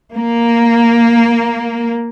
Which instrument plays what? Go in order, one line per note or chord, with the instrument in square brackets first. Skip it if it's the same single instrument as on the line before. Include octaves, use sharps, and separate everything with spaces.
[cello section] A#3